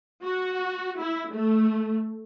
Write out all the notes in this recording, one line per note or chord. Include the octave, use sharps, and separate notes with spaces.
F#4
E4
A3